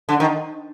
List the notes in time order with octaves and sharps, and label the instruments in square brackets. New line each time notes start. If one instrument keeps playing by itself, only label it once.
[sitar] D3
D#3